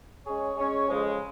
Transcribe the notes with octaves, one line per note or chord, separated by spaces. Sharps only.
G#3 C#4 G#4 C#5
G#3 C#4 G#4 C#5
F2 C#3 F3 G#3